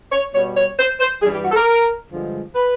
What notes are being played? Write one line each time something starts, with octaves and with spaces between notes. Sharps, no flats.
C#5
B2 G3 C#5
C#5
C5
C5
G2 E3 G3 G#4
G4
F#4
A4
A#4
G2 D3 F3 G#3
B4